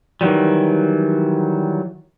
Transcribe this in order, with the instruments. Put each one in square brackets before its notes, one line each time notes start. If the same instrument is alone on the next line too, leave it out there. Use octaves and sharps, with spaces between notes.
[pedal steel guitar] D#3 E3 F#3 G3